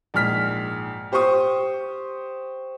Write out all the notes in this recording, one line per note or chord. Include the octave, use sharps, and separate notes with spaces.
A#1 G#2 F6 B6
G4 C5 C6 C#6 D#6